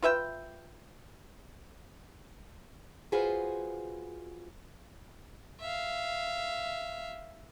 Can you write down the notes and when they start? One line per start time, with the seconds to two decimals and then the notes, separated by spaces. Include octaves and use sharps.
0.02 F4 B4 E5 G5
3.12 F4 F#4 G#4 B4 C5
5.60 E5 F5